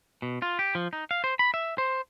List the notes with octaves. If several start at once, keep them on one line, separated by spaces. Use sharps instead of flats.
B2
F4
G4
F3
D#4
F5
C5
B5
E5
C5